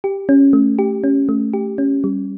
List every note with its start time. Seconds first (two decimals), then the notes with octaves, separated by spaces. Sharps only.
0.04 G4
0.29 C#4
0.53 A3
0.79 G4
1.04 C#4
1.29 A3
1.53 G4
1.78 C#4
2.04 G3